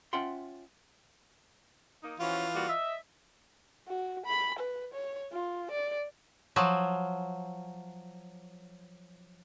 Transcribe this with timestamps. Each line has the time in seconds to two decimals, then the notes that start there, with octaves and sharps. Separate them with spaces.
0.13 C#4 F4 E5 F#5 G5 C6
2.04 A#3 D#4
2.20 E3 F3 C#4 F4 F#4
2.54 G3 A#3 F#4
2.69 D#5 E5
3.88 F#4
4.26 B5
4.59 B4
4.94 C#5
5.32 F4
5.71 D5
6.56 F3 F#3